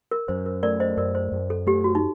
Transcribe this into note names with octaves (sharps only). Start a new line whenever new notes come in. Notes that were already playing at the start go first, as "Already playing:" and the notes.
A#4
F#2 C5
A#4
A3 A#4 D5
C5 D#5
F#2 A#4 D5
C5
F#2
A4
A3 G4
F#4
D#4